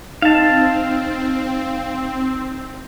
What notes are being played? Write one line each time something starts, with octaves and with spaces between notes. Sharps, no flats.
C4 D#4 F5 A5